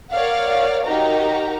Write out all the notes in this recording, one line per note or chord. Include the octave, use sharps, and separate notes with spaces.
A#4 C#5 D5 F5 F#5
D#4 F#4 G4 A#4 A#5